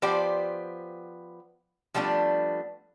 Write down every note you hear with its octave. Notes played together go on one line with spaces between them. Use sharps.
F3 B3 G4 C5 D5
F3 G3 A3 B3 D4